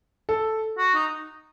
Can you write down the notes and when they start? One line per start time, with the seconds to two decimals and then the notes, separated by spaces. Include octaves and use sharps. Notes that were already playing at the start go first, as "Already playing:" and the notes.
0.29 A4
0.78 F#4
0.95 D#4